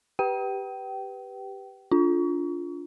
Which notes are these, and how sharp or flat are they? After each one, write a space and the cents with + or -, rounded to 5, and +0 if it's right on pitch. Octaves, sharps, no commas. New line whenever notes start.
G4 +0 B4 +0 G5 -30
D4 -25 F4 +0